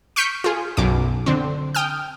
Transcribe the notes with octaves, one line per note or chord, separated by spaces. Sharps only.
C#6 F6 G6 B6 C#7 D7
F4 G#4
B1 F#2 D6
D3 C4
G5 D#6 F6